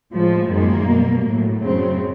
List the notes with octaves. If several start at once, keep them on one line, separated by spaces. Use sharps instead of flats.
A2 F3 G#3
F#2 D#3 G#3 A#3
B2 G3
A2 F#3
F#2 C#3 F#3 C4